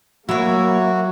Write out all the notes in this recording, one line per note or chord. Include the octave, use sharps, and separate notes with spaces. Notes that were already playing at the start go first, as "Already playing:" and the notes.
F#3 A#3 E4 F#4 C#5